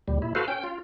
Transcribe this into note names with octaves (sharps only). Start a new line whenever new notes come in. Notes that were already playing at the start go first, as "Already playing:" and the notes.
D2 A#2 G3
A#2 E4
F#4 A4 B4 C5 F5
C#4 G5
F4